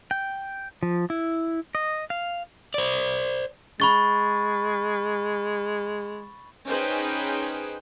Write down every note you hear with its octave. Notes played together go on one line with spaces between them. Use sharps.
G5
F3
E4
D#5
F5
C5 D5
G#3 B5 C#6 A6
C#4 D#4 G#4 B4 C5 G5